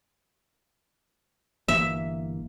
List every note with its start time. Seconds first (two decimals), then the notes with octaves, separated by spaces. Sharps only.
1.68 G1 E3 A#3 E5